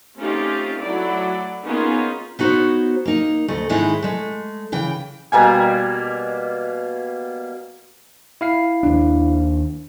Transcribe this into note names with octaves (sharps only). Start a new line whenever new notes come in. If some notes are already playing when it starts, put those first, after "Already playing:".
A3 C4 C#4 D#4 F4 G4
F#3 A3 E4 D5
A#3 B3 C#4 D#4 F4 G#4
B3 D#4 F#4 C5 C#5
A#3 D#4
D2 A3 D#5
G#2 D#3 G#3 D#4 E4
G#3 A3
C#3 E3 G5
B2 G3 A#3 G#5
E4 F5 C7
D#2 D4